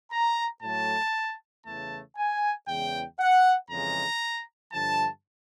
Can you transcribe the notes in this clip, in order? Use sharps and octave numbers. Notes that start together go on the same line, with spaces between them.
A#5
A2 F#3 A3 A5
E2 C#3 E3 A3 A5
G#5
E2 C#3 E3 G#3 G5
F#5
F2 C#3 E3 G#3 A#5
G2 D3 F3 A5